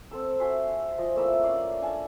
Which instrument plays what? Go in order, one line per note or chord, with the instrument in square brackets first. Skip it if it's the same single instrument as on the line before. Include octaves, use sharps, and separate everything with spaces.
[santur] C4 A4 E6
F#4 E5 G#5 C6
F3 D5 D#5
A3 A#3 E4 E6
C#4 D5 F5
D4 G#5 A5